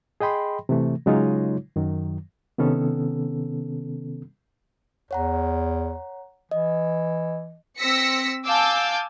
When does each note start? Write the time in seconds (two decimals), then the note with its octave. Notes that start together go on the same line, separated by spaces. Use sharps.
0.21 G#4 D#5 G5 B5 C6
0.69 C3 E3 A3
1.06 C#3 F#3 G#3 D#4 F4 C#5
1.76 F#2 D#3 F#3
2.58 C3 D#3 B3 C#4 A4
5.11 E2 C#5 F#5 A#5
6.51 E3 D#5
7.77 C4 E6 A#6 B6 C#7
8.46 F5 G#5 A5 D6 E6 G6